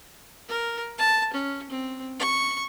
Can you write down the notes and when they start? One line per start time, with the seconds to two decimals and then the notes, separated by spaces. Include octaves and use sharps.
0.49 A#4
0.98 A5
1.33 C#4
1.70 C4
2.19 C#6